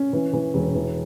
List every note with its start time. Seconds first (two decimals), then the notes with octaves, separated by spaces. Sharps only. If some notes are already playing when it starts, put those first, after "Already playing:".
Already playing: C#4
0.13 E3
0.33 E3
0.54 E1
0.75 E3